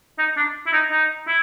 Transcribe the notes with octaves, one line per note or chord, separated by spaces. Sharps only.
D#4
D4
E4
D#4
D#4
E4